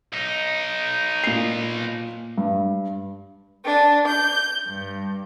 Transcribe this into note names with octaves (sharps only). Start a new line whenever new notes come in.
B1 D#4
A#2 C7
G2
D4
G6
G2